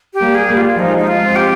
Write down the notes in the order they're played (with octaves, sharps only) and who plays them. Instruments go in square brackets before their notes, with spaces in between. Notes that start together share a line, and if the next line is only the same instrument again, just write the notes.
[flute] G4
[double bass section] G3 A#3
[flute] G#4
[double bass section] G3 A#3
[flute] F4
[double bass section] F3 G#3 [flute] D#4
[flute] D#4
F4
[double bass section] G#3 C4
[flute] G4